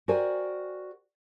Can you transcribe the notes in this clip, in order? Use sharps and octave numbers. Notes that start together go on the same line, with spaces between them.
F#4 A#4 C5 D5 G5 G#5